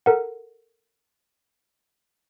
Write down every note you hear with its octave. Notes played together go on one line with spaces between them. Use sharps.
A4 A#4 F#5